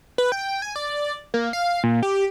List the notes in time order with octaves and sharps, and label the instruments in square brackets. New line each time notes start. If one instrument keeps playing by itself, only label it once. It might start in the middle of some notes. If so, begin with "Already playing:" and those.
[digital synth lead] B4
G5
G#5
D5
A#3
F5
A#2
G4